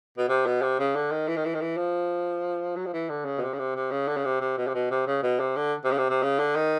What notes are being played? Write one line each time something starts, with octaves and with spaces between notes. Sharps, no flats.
B2
C3
B2
C3
C#3
D3
D#3
E3
D#3
E3
D#3
E3
F3
F#3
F3
E3
D3
C#3
B2
C3
C#3
C3
C3
C#3
D3
C#3
C3
C3
B2
C3
B2
C3
C#3
B2
C3
D3
C3
C#3
C3
C3
C#3
D3
D#3